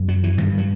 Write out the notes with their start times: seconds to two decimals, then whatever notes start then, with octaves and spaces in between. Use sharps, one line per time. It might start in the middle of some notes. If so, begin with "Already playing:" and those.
Already playing: F#2
0.08 F#3
0.23 E3
0.38 G2 D#3
0.58 F#3